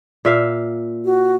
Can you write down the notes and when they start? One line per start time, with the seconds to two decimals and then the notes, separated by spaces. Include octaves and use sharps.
0.25 A#2 E5 F5
1.05 F#4